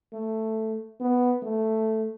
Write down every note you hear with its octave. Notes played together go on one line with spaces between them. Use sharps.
A3
B3
A3